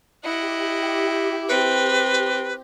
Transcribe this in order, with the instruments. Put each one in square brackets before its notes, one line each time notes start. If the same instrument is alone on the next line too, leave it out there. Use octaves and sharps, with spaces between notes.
[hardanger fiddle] E4 [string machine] G4 [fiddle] D#5 F#5
[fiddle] C4 [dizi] B4